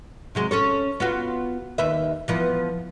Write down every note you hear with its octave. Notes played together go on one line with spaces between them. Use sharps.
C3 F#3 G#3
C#4 A4 C#5
B3 F4 F#4
D#2 B4 E5
E3 F3 B3